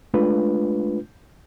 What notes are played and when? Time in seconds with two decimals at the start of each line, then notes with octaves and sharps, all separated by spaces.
0.14 G#3 A3 D4 F4 B4